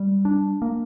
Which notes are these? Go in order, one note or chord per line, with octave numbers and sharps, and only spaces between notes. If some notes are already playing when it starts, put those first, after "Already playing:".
Already playing: G3
D4
A#3